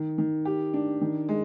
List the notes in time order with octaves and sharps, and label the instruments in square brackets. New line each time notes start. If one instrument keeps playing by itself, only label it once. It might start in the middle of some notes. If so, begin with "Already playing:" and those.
Already playing: [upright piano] D#3
D#3
G4
D4
D#3
G#3